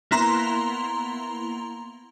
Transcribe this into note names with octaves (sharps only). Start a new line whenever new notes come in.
A#3 B3 E4 A#5 C6